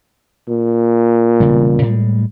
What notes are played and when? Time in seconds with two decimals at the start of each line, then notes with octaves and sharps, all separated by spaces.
0.48 A#2
1.40 E1 C#3 G3
1.82 A2 G3 G#3